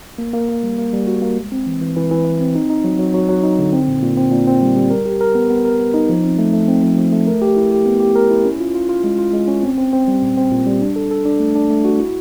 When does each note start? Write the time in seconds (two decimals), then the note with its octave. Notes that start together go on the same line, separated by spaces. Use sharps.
0.18 A#3
0.33 A#3
0.49 A#3
0.63 G3
0.78 A#3
0.93 G3
1.07 F#4
1.22 A#3
1.37 G#3
1.52 C4
1.67 E3
1.81 E3
1.96 E3
2.11 E3
2.25 E3
2.40 C4
2.55 D#4
2.70 D#4
2.84 F#3
2.99 F#3
3.14 F#3
3.29 F#3
3.43 D#4
3.59 D3
3.73 C4
3.88 A#2
4.03 A#2
4.17 C4
4.32 A#2
4.47 C4
4.62 G3
4.76 G3
4.90 A#4
5.05 G4
5.21 A#4
5.35 B3
5.50 B3
5.65 A#4
5.80 B3
5.94 D#4
6.09 F3
6.24 C4
6.38 A3
6.53 A3
6.68 C4
6.83 F3
6.97 F3
7.12 A3
7.27 A#4
7.42 G4
7.57 E4
7.71 G4
7.86 B3
8.00 G4
8.16 A#4
8.30 E4
8.45 C#4
8.60 F4
8.75 F4
8.89 F4
9.04 G#3
9.19 F4
9.33 G#3
9.48 C#4
9.63 C4
9.78 C4
9.93 C4
10.08 G3
10.22 A#2
10.37 C4
10.51 A#2
10.67 G3
10.81 D4
10.96 A4
11.11 A4
11.25 D4
11.40 A3
11.55 D4
11.70 A3
11.85 F#4
11.99 E4